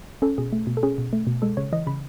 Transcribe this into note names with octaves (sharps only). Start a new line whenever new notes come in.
C#4 A4
B2 G#4
A3
B2
A4
C#4 G#4
B2
A3
B2
G#3 A4
C#3 C#5
E3 D#5
C#3 B5